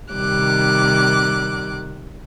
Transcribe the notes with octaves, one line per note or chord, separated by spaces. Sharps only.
C3 D#3 G3 D6 F#6